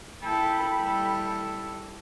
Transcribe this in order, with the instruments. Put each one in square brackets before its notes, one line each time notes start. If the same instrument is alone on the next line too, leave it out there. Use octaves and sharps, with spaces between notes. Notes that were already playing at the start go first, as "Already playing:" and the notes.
[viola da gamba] E4 A4 [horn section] G5 B5
[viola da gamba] G3 E4 A4